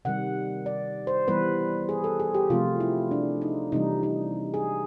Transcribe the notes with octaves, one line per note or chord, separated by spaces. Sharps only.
C3 D#3 G3 F#5
D5
C5
E3 G3 B3 B4
G#4
A4
G#4
G4
C3 F3 A3 F4
E4
D4
D#4
C3 E3 G3 D#4
D#4
G#4